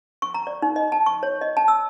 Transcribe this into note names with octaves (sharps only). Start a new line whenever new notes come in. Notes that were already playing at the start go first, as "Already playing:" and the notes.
C#6
A#5
D5
D#4
D#5
A5
C#6
C#5
D#5
A5
E6